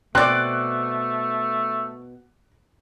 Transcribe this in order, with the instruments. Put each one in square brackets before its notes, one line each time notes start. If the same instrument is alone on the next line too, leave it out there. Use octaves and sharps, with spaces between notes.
[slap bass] B2 [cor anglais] A3 [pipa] C4 D5 [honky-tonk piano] F#6